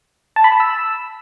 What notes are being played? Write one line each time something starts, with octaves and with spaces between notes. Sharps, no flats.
A5
B5
A5
E6